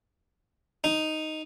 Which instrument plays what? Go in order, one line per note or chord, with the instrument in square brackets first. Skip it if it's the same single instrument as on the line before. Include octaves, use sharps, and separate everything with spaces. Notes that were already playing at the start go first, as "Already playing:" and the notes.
[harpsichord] D#4